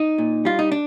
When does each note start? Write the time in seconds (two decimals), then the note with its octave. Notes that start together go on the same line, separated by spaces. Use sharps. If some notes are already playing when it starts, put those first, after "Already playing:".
Already playing: D#4
0.18 A#2
0.45 G3 F4
0.59 D#4
0.72 D4